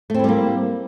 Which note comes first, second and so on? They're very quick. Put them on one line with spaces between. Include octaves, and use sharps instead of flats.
A3 C4 E4 G3 A#3